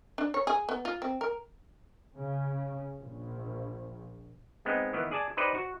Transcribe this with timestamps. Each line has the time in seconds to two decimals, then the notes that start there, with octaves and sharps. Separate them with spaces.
0.18 D4
0.34 C#5
0.47 G#4
0.69 B3
0.85 F4
1.02 C4
1.21 A#4
2.17 C#3
3.00 A#1
4.65 G#3 B3 C4 D#4
4.93 D#3 E3 B3
5.11 G#4 D5 G#5 A5
5.37 D#4 G4 B4 C5 D5 D#5
5.55 F#4